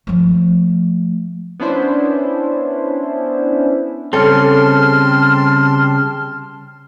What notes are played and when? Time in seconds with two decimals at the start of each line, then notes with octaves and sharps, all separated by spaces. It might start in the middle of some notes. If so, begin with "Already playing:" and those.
0.07 F3 A3
1.59 B3 C#4 D4 E4 C5
4.13 C#3 G3 C4 A4 C#5 A5 C6 F6